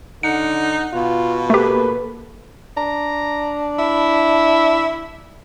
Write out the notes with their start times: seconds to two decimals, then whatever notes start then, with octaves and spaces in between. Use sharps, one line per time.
0.23 D3 D#4 F#5 C#7
0.93 B2 F4
1.50 A3 A#3 G4 A4 B4
2.77 D4 A#5
3.79 E4